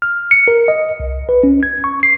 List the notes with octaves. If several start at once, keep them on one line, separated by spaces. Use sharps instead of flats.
F6
C#7
A#4
D#5
C2
B4
C#4
G#6
C#6
C7